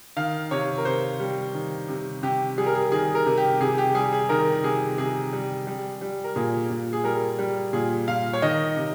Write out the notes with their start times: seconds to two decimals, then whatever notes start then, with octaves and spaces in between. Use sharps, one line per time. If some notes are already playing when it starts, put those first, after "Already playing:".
0.16 D#3 F5
0.51 C3 C#5
0.78 A#4
0.85 C3 C5
1.20 G3
1.54 D#3
1.88 C3
2.23 C3 G4
2.58 G3 G#4
2.66 A#4
2.75 G#4
2.91 D#3 G#4
3.15 A#4
3.26 C3
3.38 G4
3.60 C3 G#4
3.78 G4
3.95 G3 G#4
4.13 G#4
4.29 D#3 A#4
4.64 C3 G#4
4.98 C3 G#4
5.33 G3
5.67 G3
6.01 G3
6.24 A#4
6.36 A#2 G#4
6.70 A#2
6.93 G#4
7.04 G3 A#4
7.39 G3
7.73 A#2 G#4
8.08 A#2 F5
8.33 C#5
8.42 D#3 D#5
8.76 C3